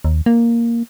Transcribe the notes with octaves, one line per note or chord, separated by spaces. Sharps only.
D#2
A#3